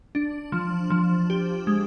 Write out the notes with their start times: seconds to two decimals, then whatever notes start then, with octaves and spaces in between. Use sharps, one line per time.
0.15 D4
0.52 F3
0.90 F3
1.30 G4
1.67 G#3